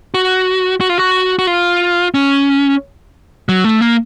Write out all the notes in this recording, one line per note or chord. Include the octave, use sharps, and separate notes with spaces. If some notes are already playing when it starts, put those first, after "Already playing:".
F#4
F#4
F4
F#4
F#4
F4
C#4
F#3
A3
A#3